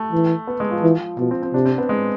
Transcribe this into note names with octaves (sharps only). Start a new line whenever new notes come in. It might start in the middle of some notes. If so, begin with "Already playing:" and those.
Already playing: A3
E3
B3
G#3
F3
E3
B2 F3
C4
C4
C3 D4
C4
B3
G#3